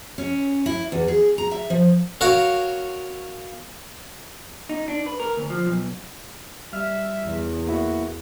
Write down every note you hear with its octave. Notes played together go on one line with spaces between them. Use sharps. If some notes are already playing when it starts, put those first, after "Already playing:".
C#4
E4
E2
G#4
A#5
E5
F3
F#4 A#4 C#5 F5
D#4
D4
B4
A#4
D2
F3
B1
G3 E5 F6
E2
A#3 E4 F#4 E5